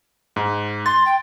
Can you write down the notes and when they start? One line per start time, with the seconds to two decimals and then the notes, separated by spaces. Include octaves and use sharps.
0.36 G#2
0.86 C6 A6
1.06 G5